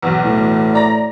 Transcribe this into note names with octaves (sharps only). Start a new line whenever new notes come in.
B1 E2
A2
D5 A#5 A#6